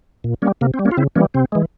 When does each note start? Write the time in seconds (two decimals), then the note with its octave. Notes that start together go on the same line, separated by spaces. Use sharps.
0.24 A#2
0.42 G3 A#3 C#4
0.61 C3 A#3
0.74 C4
0.79 G3
0.85 A#3 C#4
0.91 F4
0.97 C#3 C4 E4
1.16 E3 G3 A#3 C#4
1.34 C3 C4
1.52 E3 G#3